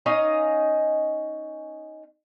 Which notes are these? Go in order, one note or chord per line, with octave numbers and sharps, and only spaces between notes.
C#4 D#4 D#5 F5